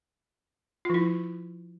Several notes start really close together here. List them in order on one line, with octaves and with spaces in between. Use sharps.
F4 F3 E4